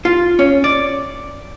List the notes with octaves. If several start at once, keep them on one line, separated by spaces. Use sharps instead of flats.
F4
C#4
D5